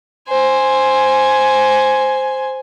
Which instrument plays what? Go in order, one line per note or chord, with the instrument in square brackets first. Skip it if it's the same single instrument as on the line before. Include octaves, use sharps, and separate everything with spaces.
[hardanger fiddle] C5 G#5